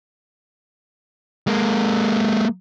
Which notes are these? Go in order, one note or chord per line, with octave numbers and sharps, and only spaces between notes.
G#3 A#3